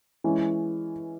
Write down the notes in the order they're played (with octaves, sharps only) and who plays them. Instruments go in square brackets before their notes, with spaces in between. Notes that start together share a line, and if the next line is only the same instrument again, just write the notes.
[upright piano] E3 G#3 C#4